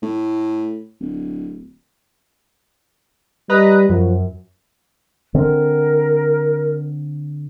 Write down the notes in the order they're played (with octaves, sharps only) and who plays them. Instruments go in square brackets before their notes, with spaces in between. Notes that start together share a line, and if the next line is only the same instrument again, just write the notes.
[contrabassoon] A2
D1
[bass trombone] G3 [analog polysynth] B4 D#5 A#5
[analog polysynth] F#2 [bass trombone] F3
[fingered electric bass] D3 C4 [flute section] A#4